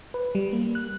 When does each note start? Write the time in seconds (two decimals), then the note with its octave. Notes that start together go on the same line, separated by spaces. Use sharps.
0.14 B4
0.35 G3
0.53 A#3
0.75 F#6